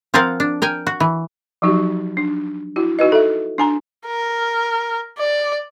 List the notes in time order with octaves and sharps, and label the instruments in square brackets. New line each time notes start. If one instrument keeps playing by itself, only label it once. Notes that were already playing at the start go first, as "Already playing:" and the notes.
[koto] F3 C4 F4 A#4 F5 F#5
D4
A#4 G5 G#5
F#4
E3
[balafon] F3 F#3 D#4 F#4 G4
D4
E4 F#4
D#4 F#4 B4 D#5
A4 E5
D4 G#5 A#5
[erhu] A#4
D5